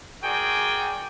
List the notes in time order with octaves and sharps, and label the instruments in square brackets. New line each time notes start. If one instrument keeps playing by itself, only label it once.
[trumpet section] F#4 G#4 A#4 D5 G5 G#5